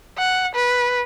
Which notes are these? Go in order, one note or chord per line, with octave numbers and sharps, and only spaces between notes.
F#5
B4